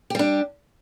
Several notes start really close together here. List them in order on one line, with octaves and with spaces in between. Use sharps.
G4 G3 D4